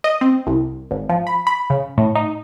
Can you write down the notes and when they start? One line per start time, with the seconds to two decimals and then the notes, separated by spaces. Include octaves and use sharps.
0.04 D#5
0.21 C4
0.47 C2
0.91 G#1
1.09 F3
1.27 B5
1.47 B5
1.70 C#3
1.98 A2
2.15 D#4